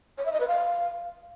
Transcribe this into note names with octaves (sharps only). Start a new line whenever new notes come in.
C#5
E5
D#5
B4
F5